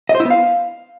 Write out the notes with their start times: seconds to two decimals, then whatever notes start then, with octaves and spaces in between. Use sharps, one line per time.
0.09 D#5
0.15 C5
0.20 E4
0.25 B3
0.30 F5